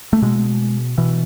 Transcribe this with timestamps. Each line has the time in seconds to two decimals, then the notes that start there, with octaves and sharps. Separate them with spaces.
0.13 A3
0.22 B2 G#3
0.98 B2 E3